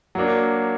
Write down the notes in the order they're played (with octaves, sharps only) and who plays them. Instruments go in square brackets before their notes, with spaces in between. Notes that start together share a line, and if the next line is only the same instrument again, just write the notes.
[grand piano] F#3 A#3 D4